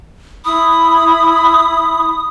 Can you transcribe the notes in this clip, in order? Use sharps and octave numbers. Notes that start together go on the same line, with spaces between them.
E4 B5 D#6